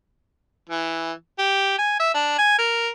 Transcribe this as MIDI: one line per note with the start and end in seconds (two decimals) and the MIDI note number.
0.69 1.12 52
1.39 1.77 67
1.79 1.96 80
2.00 2.13 76
2.14 2.36 62
2.39 2.58 80
2.58 2.89 70